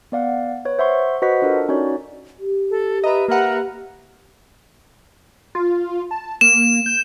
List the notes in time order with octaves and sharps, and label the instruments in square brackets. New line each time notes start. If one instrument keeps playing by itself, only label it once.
[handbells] B3 D5 F5 F#5
B4 C#5
C5 E5 F#5 C6 C#6
F#4 B4 C5 D#5 F#5 B6
D4 F4 A4 A#4
C#4 D#4 F#4 C#5 D5
[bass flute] G4
[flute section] A4
[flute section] B4 E5 A#5 [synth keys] D#5
[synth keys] A#3 F#5 [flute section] A#4 B4 E5
[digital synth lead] F4
A5
[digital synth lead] A#3 [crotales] E7
[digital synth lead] G6